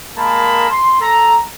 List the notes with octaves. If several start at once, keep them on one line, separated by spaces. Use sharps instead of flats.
G#3 A#3 A#4 A5 B5
C6
A4 A#5